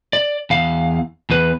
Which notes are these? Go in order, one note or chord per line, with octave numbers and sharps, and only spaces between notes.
D5
E2 F5
E2 B4